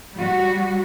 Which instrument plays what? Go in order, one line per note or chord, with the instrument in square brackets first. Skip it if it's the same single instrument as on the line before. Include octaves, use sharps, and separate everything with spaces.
[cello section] G3 F#4